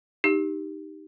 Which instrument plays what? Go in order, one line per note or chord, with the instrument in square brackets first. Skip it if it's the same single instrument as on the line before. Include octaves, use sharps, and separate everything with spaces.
[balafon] D#4 G4